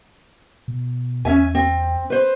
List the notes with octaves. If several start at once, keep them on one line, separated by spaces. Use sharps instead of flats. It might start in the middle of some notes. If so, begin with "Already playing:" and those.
B2
E2 C#4 E5 G#5
C4
B4 C5